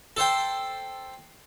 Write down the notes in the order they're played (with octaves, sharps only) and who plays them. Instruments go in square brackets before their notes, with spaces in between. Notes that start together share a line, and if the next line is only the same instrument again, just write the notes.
[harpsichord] A4 C5 G5